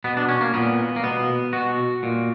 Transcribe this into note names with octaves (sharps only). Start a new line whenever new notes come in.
B2 B3
D4
C#4
A#3
A#2 B3
A#3
B2 B3
B2 F#4
A#2